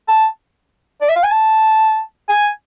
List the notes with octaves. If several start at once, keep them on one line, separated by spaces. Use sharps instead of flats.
A5
D5
E5
F5
G#5
A5
G#5